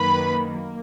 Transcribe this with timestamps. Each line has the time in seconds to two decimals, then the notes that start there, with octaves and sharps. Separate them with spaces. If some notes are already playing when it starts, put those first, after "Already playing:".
Already playing: F#2 D#3 A#3 B4 B5
0.51 A#3